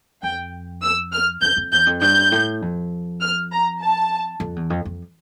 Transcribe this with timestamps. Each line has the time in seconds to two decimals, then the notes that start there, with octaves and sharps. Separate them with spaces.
0.23 F2 G5
0.82 E6
1.12 F6
1.42 F2 G6
1.57 F2
1.72 E2 G6
1.86 F2
2.01 G2 G6
2.32 A2
2.62 F2
3.21 F6
3.52 A#5
3.81 A5
4.40 F2
4.56 E2
4.70 F2
4.85 F2